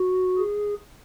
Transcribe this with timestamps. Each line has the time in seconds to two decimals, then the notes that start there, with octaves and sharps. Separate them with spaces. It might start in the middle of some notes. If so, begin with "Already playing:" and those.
Already playing: F#4
0.38 G#4